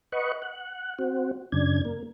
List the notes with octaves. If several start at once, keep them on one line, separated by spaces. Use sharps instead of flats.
B4 D#5 F#5 C#6
F#5
C4 F#4
F#2 C#3 D4 G#6
A#3